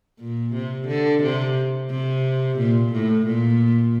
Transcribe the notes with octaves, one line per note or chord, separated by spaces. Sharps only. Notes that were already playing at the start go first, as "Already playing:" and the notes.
A#2
C3
D3
C3
C3
A#2
A2
A#2